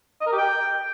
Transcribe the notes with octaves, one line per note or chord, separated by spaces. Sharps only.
D#5
A#4
G4
G5